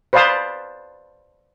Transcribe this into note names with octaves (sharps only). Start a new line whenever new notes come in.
B4 C5 D5 F5 A5 D#6